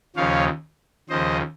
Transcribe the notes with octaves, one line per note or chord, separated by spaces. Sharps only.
D#2 C#3 F3 C#5 F5
D#2 C#3 F3 C5 D#5